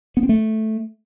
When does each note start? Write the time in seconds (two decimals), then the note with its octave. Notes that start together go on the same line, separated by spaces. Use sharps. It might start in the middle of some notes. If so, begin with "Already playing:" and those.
0.17 B3
0.23 C4
0.29 A3